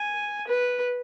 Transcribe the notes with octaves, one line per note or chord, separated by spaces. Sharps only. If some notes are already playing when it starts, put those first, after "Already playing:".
Already playing: G#5
B4